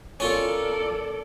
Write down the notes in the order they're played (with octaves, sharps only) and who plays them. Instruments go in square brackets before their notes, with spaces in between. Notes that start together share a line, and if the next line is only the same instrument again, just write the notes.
[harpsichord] C#4 F4 [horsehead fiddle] A4 D5 [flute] A#4